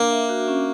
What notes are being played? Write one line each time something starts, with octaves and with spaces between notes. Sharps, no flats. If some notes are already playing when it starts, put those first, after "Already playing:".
Already playing: A#3 D4
E5
F#4
C#4